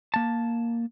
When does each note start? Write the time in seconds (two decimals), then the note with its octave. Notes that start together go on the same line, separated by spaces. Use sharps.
0.14 A#3 A5